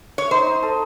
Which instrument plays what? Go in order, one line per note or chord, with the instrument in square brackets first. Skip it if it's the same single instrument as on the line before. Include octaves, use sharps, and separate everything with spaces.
[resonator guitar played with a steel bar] C#5
[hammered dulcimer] D#4 [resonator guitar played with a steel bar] C5
[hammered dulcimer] D#4
A4